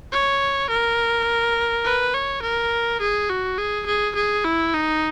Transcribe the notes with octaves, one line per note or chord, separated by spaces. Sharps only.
C#5
A#4
B4
C#5
A#4
G#4
F#4
G#4
G#4
G#4
E4
D#4